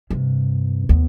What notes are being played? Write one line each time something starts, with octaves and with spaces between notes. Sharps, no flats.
G2 C3
D#2 B3